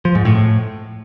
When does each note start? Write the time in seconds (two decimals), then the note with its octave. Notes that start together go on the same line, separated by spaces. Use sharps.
0.05 F3
0.15 G#2
0.25 A2
0.35 A2